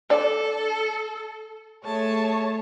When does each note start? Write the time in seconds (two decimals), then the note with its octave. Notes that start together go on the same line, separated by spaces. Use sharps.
0.10 D4 A4 D5
1.85 A3 G#4 C#5 A5